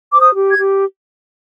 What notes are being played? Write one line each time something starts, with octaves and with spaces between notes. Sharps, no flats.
C5 D6
D#6
G4
G#6
G4